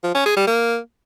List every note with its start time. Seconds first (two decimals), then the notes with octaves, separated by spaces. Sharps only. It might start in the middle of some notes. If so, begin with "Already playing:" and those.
0.04 F3
0.15 C#4
0.26 G#4
0.36 G3
0.47 A#3